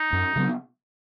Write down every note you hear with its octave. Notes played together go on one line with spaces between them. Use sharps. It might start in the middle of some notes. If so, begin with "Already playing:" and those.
Already playing: D#4
F#2
C#3 F#3 B3